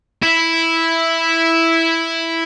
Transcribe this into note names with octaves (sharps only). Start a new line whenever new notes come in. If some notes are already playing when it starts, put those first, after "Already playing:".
E4